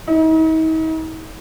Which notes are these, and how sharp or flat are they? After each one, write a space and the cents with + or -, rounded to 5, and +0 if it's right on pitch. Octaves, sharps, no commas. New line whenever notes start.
D#4 +40